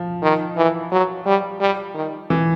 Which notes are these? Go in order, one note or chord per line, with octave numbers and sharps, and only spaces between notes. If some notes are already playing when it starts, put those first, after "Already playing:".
Already playing: F3
D#3
E3
F#3
G3
G3
D#3
E3